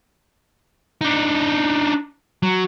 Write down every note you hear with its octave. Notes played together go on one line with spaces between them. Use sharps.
D4 D#4
F#3